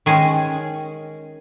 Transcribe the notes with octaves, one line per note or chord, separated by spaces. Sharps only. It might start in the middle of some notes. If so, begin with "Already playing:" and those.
D#3 G#3 C#4 G#4 G#5